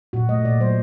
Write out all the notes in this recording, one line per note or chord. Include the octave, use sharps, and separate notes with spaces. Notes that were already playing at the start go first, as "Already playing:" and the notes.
A#2 F#4
A3 D#5
A#2 D5
F#3 C5